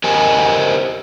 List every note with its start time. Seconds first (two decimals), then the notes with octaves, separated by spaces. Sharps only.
0.04 G4 A#4 C5 D#5 G#5